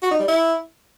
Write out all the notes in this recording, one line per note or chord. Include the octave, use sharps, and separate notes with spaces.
F#4
D#4
G3
E4